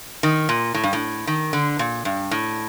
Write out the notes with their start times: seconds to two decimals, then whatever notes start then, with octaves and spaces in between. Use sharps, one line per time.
0.23 D#3
0.49 A#2
0.74 A2
0.84 G2
0.93 A2
1.27 D#3
1.53 D3
1.79 A#2
2.05 G2
2.31 A2